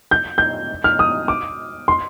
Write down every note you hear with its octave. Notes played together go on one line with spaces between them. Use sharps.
G6
G6
F6
D#6
D6
C6